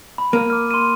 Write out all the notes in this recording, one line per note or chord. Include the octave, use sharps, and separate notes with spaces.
B5
A#3 D#7
D6 F6
C6 D#7